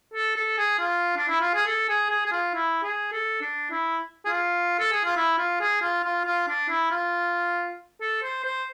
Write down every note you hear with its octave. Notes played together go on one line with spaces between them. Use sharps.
A4
A4
G#4
F4
D4
E4
F4
G#4
A4
G#4
G#4
G#4
F4
E4
G#4
A4
D4
E4
G#4
F4
A4
G#4
F4
E4
F4
G#4
F4
F4
F4
D4
E4
F4
A4
C5
C5